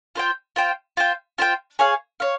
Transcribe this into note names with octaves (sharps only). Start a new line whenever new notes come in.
F4 C5 G5
F4 C5 G5
F4 C5 G5
F4 C5 G5
G#4 C#5 F5
C#5 F5